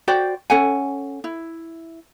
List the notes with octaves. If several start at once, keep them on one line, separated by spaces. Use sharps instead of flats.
F#4 C5 D5 G5
C#4 A4 F#5 G#5
E4